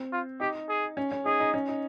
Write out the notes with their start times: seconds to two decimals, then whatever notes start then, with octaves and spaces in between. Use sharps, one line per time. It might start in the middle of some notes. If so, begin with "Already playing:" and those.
Already playing: C4
0.12 F4
0.40 D#4 G4
0.69 G#4
0.97 C#4
1.12 C#4
1.26 D#4 G#4
1.40 D#4
1.54 C#4
1.68 D#4